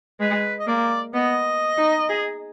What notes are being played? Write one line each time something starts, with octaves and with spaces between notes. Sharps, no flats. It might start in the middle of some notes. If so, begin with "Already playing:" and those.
G#3 B4
D#5
A#3 D5
B3 D#5
D#4
G#4